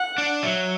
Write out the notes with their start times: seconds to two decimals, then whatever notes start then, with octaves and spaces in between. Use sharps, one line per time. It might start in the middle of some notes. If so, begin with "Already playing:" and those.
Already playing: F#5
0.18 D4
0.43 F#3 E5